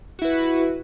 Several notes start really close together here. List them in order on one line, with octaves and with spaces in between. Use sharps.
F#4 E4 B4